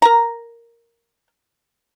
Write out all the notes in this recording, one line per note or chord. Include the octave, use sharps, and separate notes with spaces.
A#4 A#5